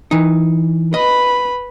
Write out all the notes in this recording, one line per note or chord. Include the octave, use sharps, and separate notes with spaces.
E3 D#4
B4 D#5 B5